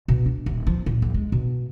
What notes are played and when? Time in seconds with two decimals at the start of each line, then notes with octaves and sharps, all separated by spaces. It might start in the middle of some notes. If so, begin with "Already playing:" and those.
0.08 B2
0.26 D4
0.46 D#1
0.67 F3
0.86 A#2
1.02 A#1
1.14 G#3
1.32 B2